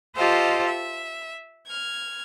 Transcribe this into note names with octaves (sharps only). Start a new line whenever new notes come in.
F4 G4 A4 C5 D#5 F5
E5
F6 G#6